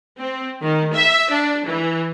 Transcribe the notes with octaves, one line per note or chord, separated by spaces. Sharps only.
C4
D#3
E5
D4
E3